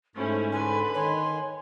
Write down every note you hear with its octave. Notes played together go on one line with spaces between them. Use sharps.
G#2 A3 C#4 E4 C5
D3 B4 G#5 C6
D#3 C#5 G#5 C6